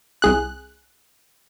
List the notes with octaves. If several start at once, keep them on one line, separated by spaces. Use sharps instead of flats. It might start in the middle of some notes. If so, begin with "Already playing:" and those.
C2 G#4 F#6